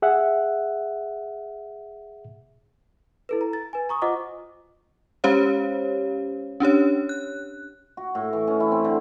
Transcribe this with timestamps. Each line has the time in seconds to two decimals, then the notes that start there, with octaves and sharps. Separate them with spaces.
0.02 G#4 E5 F#5
3.29 E4 A4 B4
3.41 A#5
3.53 A6
3.73 B4 G#5
3.89 A#5 C#6 D#6
4.02 F4 C5 D#5 F#5 D6
5.24 G#3 C#4 G4 C5 C#5 F5
6.60 C#4 D4 G4 C#5
7.09 F#6
7.97 F#4
8.15 A2
8.33 E3
8.47 C#4
8.60 E4
8.72 C4
8.85 D3